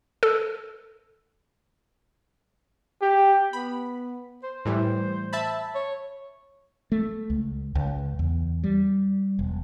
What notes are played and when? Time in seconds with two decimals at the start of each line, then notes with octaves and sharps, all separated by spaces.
0.23 A4
3.02 G4
3.53 B3 B5
4.44 C5
4.65 A2 E3 G3
5.33 E5 A5 B5
5.75 C#5
6.92 A3
7.30 C#2
7.75 C#2
8.19 E2
8.64 G3
9.39 E1